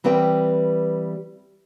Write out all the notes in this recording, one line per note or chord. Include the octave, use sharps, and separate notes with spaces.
E3 G3 C4 B4 G5